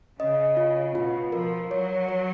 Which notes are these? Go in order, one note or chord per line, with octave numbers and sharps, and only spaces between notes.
C#3 D#5
F4
B2 F4
F3 A#4
F#3 C#5
C#5